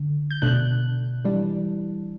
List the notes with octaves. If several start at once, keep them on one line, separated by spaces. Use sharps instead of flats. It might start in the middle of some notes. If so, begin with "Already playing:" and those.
Already playing: D3
G6
B2 A3 D4 F#6
E3 G3 D4